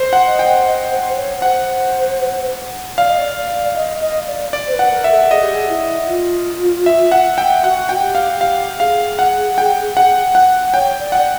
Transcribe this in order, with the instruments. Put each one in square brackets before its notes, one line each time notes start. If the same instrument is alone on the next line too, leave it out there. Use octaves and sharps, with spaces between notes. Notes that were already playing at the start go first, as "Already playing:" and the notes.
Already playing: [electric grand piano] C5
F#5
[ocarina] D#5
[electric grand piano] G5
[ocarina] D#5
C5
C#5
[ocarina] C5 [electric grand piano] F#5
[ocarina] D5 [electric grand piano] F5
[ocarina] D#5
D5
D5
D#5
D#5
D5
[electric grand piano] D5
[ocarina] C5
B4
[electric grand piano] F#5
[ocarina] A#4
[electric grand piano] E5
[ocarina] A4
[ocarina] G#4 [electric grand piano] D#5
[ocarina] G4
G#4
E4
F4
[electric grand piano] E5
F#5
G5
[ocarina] F#4 [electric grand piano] F#5
[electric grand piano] G5
[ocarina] G4
[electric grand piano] F5
[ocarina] G4 [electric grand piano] F5
[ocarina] G#4 [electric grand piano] F5
[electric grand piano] F#5
G5
F#5
F#5
[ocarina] C#5 [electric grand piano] G5
[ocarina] D5
[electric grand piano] F#5